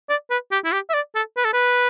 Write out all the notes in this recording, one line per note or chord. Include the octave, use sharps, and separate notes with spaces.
D5
B4
G4
E4
G4
E5
D5
A4
B4
A4
B4